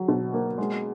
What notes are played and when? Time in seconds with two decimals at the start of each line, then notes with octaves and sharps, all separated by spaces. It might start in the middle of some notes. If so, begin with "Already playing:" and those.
Already playing: F#3
0.08 B2
0.34 A#3
0.58 G#3